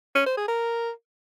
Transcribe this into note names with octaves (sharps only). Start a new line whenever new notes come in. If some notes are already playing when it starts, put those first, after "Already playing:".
C#4
C5
G#4
A#4